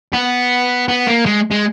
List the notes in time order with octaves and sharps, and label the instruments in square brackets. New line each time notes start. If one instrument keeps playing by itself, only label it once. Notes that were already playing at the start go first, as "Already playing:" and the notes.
[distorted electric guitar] B3
B3
A#3
G#3
G#3